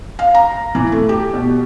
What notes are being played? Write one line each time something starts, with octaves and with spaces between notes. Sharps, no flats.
F5
A#5
E3
A3
G4
B2